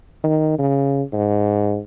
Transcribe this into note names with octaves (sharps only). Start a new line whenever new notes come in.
D#3
C#3
G#2